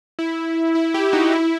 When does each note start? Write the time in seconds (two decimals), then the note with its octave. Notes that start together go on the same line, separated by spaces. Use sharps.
0.19 E4
0.75 E4
0.94 E4 G4
1.12 D#4 F#4
1.32 E4